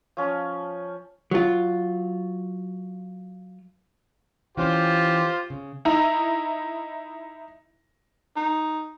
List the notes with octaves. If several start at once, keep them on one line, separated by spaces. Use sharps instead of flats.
F3 C#4
F#3 F4
E3 C#4 F4 G4 C5
C#3
D#4 E4 A#5
D#4